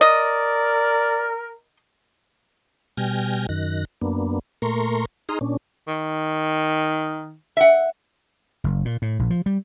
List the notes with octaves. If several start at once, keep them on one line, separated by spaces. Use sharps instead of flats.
A#4 D5 D#5
B2 G3 G5 G#5 F6 A#6
F#2 D#3 F#6 A#6
F#2 A#3 B3 D4
A#2 A3 A#4 A#5 C6 C#6
D#4 G#4 A#5 C6 D#6 F6
A#2 C#4 D4
D#3
E5 F#5
F#1
A#2
A2
A#1
F3
G3